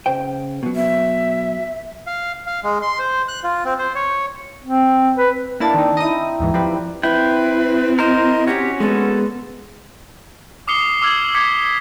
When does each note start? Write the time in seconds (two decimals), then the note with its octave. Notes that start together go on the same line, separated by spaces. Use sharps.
0.06 C#3 C5 G5
0.63 B2 F#3
0.76 E5
2.07 F5
2.47 F5
2.64 G#3
2.82 C6
2.99 C5
3.28 F#6
3.43 F4
3.65 C4
3.79 C5
3.95 C#5
4.63 C4
5.18 B4
5.60 A#3 D4 E4 D5 A6
5.74 D#3 C4 D#4
5.97 D#4 E4 D#5 D#6
6.39 D#2 G#2 E3
6.54 F3 G3 C4 B4
7.03 C4 E4 B4 G5
7.99 A#4 C5 D#5
8.47 C#4 F#4 G4
8.80 G#3 A#3 B3 A4
10.68 D6 D#6 F6 C7 C#7 G7
11.02 D6 E6 F6 G#6
11.35 D6 E6 G#6 B6 C#7